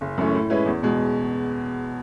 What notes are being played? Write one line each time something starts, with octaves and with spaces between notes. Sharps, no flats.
F#1
F#2 E3 A3 C#4
A2
G#3 C#4 E4 B4
E2
B2 G#3